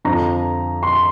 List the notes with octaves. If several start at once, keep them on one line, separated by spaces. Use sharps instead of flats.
F2 D3 F3 A#5
C6